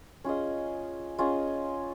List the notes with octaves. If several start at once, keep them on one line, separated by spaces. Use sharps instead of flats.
C#4 F4 G#4 D#5
C#4 F4 G#4 D#5